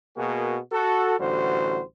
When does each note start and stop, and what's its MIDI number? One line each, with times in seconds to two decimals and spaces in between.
0.17 0.59 47
0.17 0.59 58
0.17 0.59 66
0.17 0.59 68
0.17 0.59 70
0.73 1.16 66
0.73 1.16 69
1.20 1.82 33
1.20 1.82 50
1.20 1.82 55
1.20 1.82 66
1.20 1.82 72